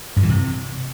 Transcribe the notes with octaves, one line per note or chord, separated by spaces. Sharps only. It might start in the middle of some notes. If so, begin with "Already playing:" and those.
G2
E3
C3